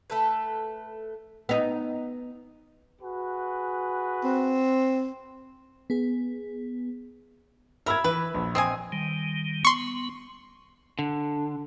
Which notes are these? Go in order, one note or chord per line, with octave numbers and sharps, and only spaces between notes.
A3 A4 B4
B3 D#4
F#4 G#4 B4
C4
B3 G#4
A#4 E5 B5 E6 G#6
E3 B4
A#1
C4 D#5 G#5 D#6
D#3 G3
B3 C6 C#6
D3